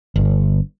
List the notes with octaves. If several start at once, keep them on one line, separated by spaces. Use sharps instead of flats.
G1